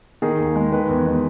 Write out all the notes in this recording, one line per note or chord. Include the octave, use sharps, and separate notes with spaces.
D#3 G#4
D#2
G#3
D#3 B4
E2
G#3